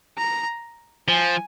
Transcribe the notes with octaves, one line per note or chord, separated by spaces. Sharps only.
A#5
F3 G#5